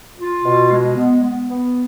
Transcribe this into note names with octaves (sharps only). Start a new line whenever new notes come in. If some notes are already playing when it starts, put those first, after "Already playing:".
F4
B2
G#3
B3
B3
B3